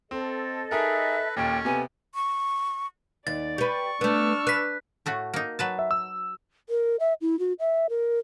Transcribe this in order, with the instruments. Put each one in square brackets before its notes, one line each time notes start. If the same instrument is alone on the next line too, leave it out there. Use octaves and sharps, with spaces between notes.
[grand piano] C4 [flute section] A4 D#5
[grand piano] D#4 G#4 A#4 [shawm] B4 [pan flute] E5
[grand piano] D#2 A#2 [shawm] C#4 [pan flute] G5
[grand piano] C3 B3 [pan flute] G#5
[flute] C#6
[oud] D#2 [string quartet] D5 [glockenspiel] A6
[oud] G4 B4 [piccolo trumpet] C#6
[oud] A3 B3 [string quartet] D4 E6 F6
[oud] B4 [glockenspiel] F#6 B6
[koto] A2 A3 F#4
A#3 D#4
F#3 B4 A5
[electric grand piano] E5
E6
[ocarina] A#4
E5
E4
F#4
E5
A#4